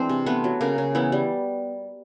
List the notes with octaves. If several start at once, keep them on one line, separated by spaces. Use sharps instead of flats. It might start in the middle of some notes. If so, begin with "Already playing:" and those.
Already playing: E3 G#3 C4 D4 C5
C3
A3 B3 B4
F#3
C#3 A#3 A#4
C#3
E3 B3 E4
G3